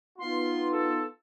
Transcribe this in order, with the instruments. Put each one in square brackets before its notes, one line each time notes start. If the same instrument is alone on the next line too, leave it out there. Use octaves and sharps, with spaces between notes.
[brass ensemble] B3 D#4 F4 [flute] C6
[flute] A4